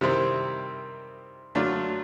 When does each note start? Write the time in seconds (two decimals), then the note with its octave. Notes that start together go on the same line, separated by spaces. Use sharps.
0.01 C3 D#3 G3 C4 E4
1.55 D3 F#3 A3 D4 F4